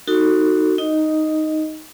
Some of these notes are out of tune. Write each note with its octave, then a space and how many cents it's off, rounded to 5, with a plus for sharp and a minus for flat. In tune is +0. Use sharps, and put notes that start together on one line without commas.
D#4 +0 F#4 +0 A4 +35
D#4 +0 D#5 +0